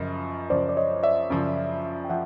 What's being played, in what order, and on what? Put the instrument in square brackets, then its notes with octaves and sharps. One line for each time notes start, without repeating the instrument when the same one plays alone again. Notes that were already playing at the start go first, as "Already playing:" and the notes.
Already playing: [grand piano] F#2 C#3 F3 [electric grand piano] D#5
[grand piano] F#2 C#3 F3 [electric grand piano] C5 D5
[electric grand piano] D5
C#5 D#5
D5 E5
[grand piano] F#2 C#3 F3
[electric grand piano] G5
[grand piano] F3 [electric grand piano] E5 F#5